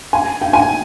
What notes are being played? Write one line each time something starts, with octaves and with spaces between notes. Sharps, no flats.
G#5
G5
G#5